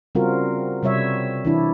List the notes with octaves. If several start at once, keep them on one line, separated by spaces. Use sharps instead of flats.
C#3 G3 C4 F4 F#4 A#4
C3 G3 C#5 E5
E3 D4 E4